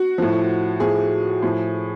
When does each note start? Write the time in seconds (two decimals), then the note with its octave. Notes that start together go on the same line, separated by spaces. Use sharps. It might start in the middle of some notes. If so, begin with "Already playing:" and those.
Already playing: F#4
0.18 A2 F3
0.80 A2 F3 G#4
1.42 A2 F3